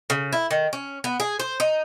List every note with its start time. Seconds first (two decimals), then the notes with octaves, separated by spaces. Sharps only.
0.10 C#3
0.33 E4
0.51 D#3
0.73 C#4
1.04 B3
1.20 G#4
1.40 C5
1.60 D#4